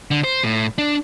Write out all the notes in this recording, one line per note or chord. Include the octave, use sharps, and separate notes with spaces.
D3
C5
A2
D4